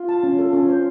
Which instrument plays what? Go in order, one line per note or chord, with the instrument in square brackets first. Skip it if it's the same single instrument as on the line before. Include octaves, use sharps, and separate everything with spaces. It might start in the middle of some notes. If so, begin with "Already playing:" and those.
Already playing: [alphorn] F4
[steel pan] A5
C#4
A4
C#4
C5